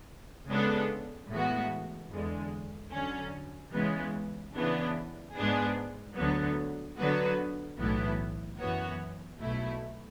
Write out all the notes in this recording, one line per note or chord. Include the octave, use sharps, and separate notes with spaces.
C#3 G#3 B3 D4 A4
A2 E3 G#3 B3 F#4
E2 D3 G#3
D3 F#3 C#4
C#3 E3 G#3 B3
C#3 E3 B3 D4
G#2 G#3 B3 D4 G#4
D2 D3 F#3 B3
D3 F#3 B3 F#4 B4
B1 A2 E3 B3 E4
F#2 E3 B3 F#4 C#5
B1 B2 A3 E4